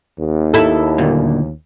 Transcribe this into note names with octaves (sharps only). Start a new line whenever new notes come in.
D#2
E4 A4
D2 A#2